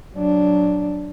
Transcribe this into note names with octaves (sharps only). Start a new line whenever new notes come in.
F#3 D4